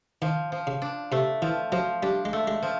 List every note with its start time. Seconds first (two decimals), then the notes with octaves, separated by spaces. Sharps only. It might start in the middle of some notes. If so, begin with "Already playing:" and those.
0.22 D#3 F3
0.52 F3
0.67 C#3
0.82 D4
1.12 C3 A3
1.42 E3 F3
1.72 F3 F#3
2.03 G3 D4
2.25 G#3
2.33 A3
2.48 G#3
2.62 F3